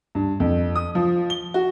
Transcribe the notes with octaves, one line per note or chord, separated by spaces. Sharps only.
G2
F2
D#6
F3
G7
F#4